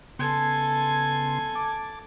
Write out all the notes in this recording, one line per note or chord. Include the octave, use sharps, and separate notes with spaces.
C#3 B3 A4 G#5 C6
A5 D6